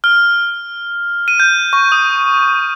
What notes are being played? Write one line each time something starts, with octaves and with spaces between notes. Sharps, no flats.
F6
D#7
G6
C#6
D#6